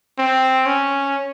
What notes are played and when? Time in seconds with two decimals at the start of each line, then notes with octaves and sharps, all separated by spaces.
0.19 C4
0.66 C#4